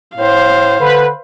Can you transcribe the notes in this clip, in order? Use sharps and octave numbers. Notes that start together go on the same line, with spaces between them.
A2 C5 F5
D3 B4